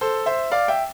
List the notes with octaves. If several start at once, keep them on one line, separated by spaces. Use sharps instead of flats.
A4 C5
C5 E5
D5 F5
E5 G5